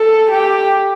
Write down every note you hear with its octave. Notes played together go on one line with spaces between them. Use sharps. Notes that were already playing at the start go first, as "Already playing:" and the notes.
Already playing: A4
G4